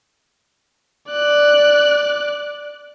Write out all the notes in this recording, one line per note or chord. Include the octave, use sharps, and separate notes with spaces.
D5 F#6